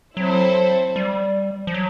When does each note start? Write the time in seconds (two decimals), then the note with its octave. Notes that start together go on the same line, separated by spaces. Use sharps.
0.17 F#3 C4 E4 A4 C5
0.96 G3
1.67 F3
1.74 F#3